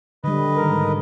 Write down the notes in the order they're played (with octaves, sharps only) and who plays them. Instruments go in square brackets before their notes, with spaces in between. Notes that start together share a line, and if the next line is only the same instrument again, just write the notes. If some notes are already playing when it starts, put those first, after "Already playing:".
[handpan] D3 G3 [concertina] B4 D#5
[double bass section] G#2 D#3 [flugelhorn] A#4